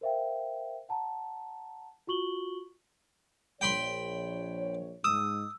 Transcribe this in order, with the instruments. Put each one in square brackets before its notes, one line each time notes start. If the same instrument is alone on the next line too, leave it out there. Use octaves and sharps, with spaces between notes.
[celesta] A#4 C5 E5 F5 G5
F#5 A5 A#5
F4 F#4 C#6 F#7 G7
[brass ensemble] A#1 C#5 [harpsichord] G5 B5 C6
[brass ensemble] G#2 [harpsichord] D#6 [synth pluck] E6